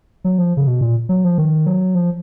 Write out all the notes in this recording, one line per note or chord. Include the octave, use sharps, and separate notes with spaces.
F#3
F3
C#3
B2
A#2
F#3
F3
D#3
F#3
F3